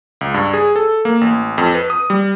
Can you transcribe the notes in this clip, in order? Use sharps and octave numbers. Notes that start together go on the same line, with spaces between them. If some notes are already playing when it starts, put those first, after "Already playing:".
C#2
G2
G#4
A4
A#3
A1
F2
B4
D#6
G3